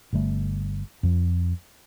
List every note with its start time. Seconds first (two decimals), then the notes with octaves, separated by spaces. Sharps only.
0.13 G1 D3 G3 A3
1.03 F2 F3